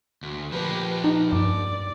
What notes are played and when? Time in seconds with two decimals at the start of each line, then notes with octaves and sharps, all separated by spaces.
0.23 D2
0.52 F3 A#3 G4 B4
1.04 D#4
1.33 G2 D5